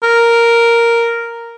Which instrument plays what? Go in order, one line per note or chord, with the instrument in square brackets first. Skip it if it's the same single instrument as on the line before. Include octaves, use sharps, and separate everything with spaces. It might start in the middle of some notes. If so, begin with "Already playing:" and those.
[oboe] A#4